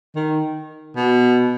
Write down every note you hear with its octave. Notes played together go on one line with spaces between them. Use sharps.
D#3
B2